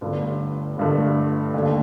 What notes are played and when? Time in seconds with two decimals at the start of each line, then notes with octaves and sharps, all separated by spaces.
0.01 G1 G2 D3 A3
0.77 G1 G2 D3 A3
1.54 D#2 D3 A3